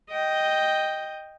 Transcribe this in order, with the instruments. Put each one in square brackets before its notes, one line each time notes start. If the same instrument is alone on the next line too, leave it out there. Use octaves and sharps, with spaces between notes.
[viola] D#5 G5